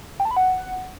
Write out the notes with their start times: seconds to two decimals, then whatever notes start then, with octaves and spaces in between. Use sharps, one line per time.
0.20 G5
0.25 A5
0.31 B5
0.37 F#5